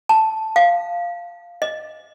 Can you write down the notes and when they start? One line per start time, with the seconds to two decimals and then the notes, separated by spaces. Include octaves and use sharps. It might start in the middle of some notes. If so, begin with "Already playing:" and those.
0.09 A5
0.56 F5
1.62 D#5